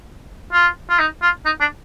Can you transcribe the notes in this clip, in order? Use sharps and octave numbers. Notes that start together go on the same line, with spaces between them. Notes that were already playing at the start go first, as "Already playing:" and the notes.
F4
F4
D#4
F4
D#4
D4